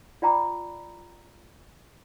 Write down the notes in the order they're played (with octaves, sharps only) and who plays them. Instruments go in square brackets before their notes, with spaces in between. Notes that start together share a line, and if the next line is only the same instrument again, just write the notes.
[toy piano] F4 D5 G5 A#5 B5 D6